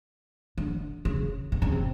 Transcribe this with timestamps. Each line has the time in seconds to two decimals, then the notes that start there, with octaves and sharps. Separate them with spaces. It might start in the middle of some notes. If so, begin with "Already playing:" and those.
0.58 D3
1.05 C#3
1.52 C3
1.62 C#3
1.72 C3